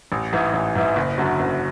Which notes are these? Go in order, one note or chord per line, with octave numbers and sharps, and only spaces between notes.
A1
G#2 E3
A1
G#2 E3
F#1
F#2 D3 F#3
F#1